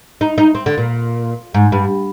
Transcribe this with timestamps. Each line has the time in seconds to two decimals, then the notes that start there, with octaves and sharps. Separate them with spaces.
0.21 D#4
0.38 D#4
0.55 C4
0.66 D3
0.78 A#2
1.54 G#2
1.72 G2